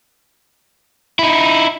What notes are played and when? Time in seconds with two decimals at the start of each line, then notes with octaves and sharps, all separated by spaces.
1.19 D#4 E4